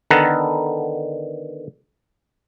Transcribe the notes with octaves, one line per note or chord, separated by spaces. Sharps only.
D3 D#3 B3 A4 A#4 F#5